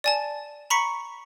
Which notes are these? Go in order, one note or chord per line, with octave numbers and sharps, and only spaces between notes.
D5 G#5 A5
A#5 B5 C#6 B6 C#7